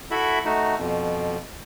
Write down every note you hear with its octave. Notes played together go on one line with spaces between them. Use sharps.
E4 F#4 A4 E5 B5
A3 D#4 F#4
F2 B2